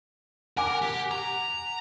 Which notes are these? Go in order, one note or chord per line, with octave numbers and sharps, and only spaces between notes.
A#4 F#5 G#5 D6
G4
A#5